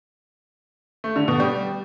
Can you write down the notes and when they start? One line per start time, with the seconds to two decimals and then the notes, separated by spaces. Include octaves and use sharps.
1.04 A3
1.16 D3
1.28 B2
1.40 G3